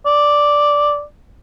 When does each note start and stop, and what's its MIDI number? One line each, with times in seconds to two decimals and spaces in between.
0.06 1.03 74